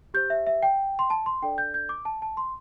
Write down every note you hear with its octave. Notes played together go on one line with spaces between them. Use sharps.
G4 C5 G6
E5
E5
G5
C6
A5
C6
D4 A4 D5 G5
G6
G6
D6
A5
A5
C6